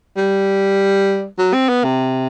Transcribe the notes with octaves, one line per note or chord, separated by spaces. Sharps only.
G3
F#3
C4
B3
C3